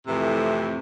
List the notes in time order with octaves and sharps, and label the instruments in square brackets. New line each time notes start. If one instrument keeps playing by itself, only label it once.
[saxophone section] F2 A2 C3 E3